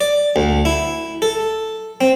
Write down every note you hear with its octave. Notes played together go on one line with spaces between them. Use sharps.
D5
D2
E4
A4
C4